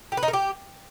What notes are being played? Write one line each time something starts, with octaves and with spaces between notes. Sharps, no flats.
G4
B4
D#4
A#4
G4